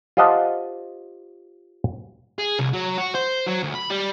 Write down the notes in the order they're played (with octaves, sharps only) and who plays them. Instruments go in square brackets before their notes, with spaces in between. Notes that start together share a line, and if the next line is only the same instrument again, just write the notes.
[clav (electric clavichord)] F4 G4 C5 D#5 F#5 A5
[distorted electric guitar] G#4
C2
F#3
F#4
C5
F#3
D2
B5
G3